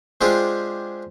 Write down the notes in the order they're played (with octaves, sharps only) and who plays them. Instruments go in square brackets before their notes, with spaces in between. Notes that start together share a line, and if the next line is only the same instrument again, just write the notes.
[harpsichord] G#3 C4 D4 F4 G4 G#4